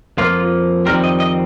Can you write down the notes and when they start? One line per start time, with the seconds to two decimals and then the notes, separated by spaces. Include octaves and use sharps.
0.17 F2 F3 A#3 F4
0.86 F2 D#3 G3 C4 A#4
1.04 D#5
1.20 D#5